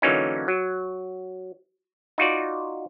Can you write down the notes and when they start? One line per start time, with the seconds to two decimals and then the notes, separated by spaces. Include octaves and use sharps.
0.02 D3 E3 F#3 A#3 C#4 D#4
0.48 F#3
2.18 D#4 F4 F#4 D5